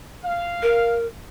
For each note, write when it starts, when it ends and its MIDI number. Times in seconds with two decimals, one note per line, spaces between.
0.24 0.97 77
0.62 1.05 70